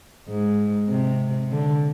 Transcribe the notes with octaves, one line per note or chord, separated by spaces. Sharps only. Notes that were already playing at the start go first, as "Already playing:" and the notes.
G#2
C3
D3